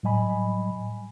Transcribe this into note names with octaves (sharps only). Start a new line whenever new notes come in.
A2 F#3 G3 D#5 G#5 B5